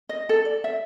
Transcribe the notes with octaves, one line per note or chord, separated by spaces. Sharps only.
D#5
A4
D5
E5